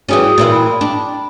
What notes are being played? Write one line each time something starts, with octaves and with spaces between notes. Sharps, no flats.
E3 G3 C#4 F#4 G#4 D#6
A#2 E3 E4
G5 B5
D4